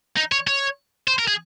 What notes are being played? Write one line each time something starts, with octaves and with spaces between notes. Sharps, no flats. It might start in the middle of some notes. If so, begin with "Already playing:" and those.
D#4
C#5
C#5
C5
A#4
G#4